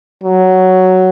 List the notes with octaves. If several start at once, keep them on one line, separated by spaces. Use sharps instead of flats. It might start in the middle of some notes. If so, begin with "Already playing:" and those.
F#3